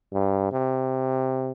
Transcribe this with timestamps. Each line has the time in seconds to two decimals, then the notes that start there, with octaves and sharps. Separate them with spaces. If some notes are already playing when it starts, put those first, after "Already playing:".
0.13 G2
0.53 C3